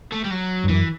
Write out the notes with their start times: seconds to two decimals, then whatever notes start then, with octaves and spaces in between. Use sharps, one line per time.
0.12 A3
0.24 G3
0.31 F#3
0.64 G2
0.69 F#2 E3